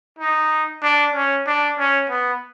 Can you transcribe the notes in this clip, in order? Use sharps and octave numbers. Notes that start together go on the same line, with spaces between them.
D#4
D4
C#4
D4
C#4
B3